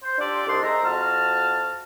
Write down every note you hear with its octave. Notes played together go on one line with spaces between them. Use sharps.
C5
D4 F4 G4 A4 D5
C2 D4 D#4 A4 C6
G#3 C5 E5 A#5
F2 F#4 A5 F6